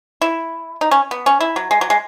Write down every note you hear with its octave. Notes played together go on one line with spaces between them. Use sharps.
E4
D#4
C#4
B3
C#4
E4
F#3
G#3
F#3
G#3